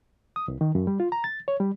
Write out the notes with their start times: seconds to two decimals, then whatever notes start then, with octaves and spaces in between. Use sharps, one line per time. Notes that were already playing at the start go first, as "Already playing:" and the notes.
0.36 D#6
0.48 C2
0.61 D#3
0.75 F#2
0.87 G3
1.00 F4
1.12 A#5
1.24 A6
1.48 C#5
1.60 G3